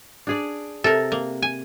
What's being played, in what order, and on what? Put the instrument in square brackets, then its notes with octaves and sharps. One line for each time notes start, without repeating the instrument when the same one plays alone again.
[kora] D4 G#4 D5
[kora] C3 [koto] A4 A#4
[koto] A#3
G#5